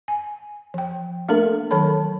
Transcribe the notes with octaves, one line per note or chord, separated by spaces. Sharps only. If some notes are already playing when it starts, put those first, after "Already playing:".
G#5
F3 G5
A3 A#3 D4 A4 A#4
D#3 F#3 A4 C#5 A5 B5